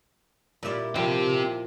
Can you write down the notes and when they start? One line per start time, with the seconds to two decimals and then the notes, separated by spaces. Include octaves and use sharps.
0.63 A#2 G3 E4 F4 D5
0.96 F3 C4 E4 F4 G4 A#4